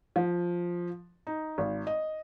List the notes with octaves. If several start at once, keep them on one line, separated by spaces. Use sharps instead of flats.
F3
D#4
G#1
D#5